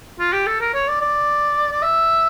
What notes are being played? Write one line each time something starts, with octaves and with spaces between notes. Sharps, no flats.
F4
G4
A4
A#4
C#5
D5
D5
D5
E5